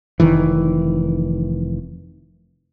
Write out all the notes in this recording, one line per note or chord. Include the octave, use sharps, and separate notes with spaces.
F1 D#3 E3